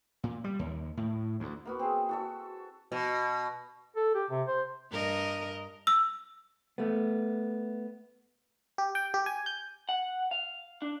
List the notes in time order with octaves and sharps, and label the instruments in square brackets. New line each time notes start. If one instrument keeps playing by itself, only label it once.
[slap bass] A#2
G3
D#2
A2
D2
[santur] A#3 B3 F#4
C4 G#4
F#4 A4 E5
[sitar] B2
[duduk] A4
G4
C3
C5
[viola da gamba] G2 A#4 D#5
[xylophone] E6
[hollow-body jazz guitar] A3 B3
[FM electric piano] G4
G5
G4
G#5
G6
[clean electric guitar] F#5
F5
D4